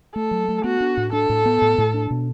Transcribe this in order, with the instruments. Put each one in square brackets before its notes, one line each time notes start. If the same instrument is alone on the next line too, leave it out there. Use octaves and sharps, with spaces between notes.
[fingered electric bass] A3 [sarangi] A4
[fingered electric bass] F#3
A3
[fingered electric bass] B3 [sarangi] F#4
[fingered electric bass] D4
A2
[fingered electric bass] D4 [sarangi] A4
[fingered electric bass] A2
B3
A2
A2
D4
B2